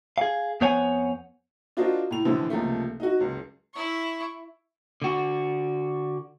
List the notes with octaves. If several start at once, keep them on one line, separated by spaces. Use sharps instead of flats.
G#4 F5
F2 B3 C5 C#5 F#5 G#5
D4 F4 F#4 A#4 C5 D#5
A2 F7
A#1 A2 D3 E3 C5
C#2 C3 F3 A3 A#3
D#4 F#4
F#1 C#2
E4 C#6
D3 F#4